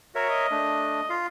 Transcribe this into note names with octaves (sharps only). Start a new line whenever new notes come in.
F#4 A#4 C#5 E5
D#5
A3 D4
F4 F5